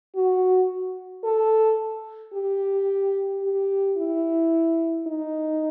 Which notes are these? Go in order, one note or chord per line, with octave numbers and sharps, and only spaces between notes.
F#4
A4
G4
G4
E4
D#4